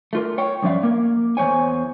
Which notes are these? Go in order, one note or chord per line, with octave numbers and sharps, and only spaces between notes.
A3 F4 A#4
C#5 G5
G2 F3 C#4 D5 E5 F5
A#3 A#4
E2 G#2 C5 C#5 G#5